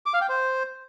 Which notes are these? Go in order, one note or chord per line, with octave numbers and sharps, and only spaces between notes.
D6
F5
G5
C5